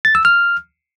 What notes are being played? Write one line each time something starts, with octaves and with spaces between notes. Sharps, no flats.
A6
E6
F6